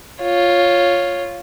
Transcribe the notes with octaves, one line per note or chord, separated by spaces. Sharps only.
F4 C#5